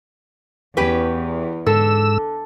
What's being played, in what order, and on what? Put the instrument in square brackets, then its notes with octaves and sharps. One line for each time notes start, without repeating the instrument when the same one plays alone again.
[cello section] E2 [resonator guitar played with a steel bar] C#4 G4 B4
[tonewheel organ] G#2 E6 [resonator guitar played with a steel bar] D3 [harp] A4